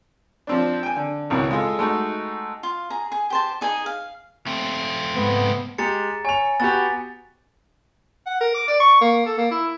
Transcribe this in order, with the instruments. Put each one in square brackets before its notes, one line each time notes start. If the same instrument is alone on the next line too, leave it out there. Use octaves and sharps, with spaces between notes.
[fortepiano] F3 C4 D4
G5 G#5
D3
G#1 C#2 B2 E3
G#3 F4 G#4 A4
G#3 A3 D#4 F#4
[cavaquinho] F4
G#4 A#5
G#4
G4 C5 A5
D#4 G#4 D#5 G#5
F5
[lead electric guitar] A3 C4
[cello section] G#2 [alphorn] B3
[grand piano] G#3 G4 [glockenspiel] A#5 A6 C#7
[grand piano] C#5 F7 [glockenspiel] G#5
[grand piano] B3 F#4 G4 [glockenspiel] A6
[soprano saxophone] F#5
A#4
D6
D5
C#6
A#3
A4
A#3
E4